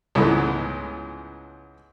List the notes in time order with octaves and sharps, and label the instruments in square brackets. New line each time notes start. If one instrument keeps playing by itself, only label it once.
[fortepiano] C#2 G#2 E3 A3 B3